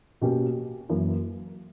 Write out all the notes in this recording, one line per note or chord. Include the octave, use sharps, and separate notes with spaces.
B2 A#3 C#4 G4
F#2 E3 A#3